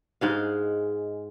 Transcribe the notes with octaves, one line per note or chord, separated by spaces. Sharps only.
G#2 G#3 F5